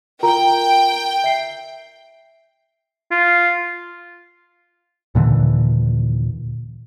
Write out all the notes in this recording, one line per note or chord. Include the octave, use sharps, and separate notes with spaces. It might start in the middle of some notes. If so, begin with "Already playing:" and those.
F4 A#4 G5 A#5
E5 C7
F4
D#2 A#2 D3 E3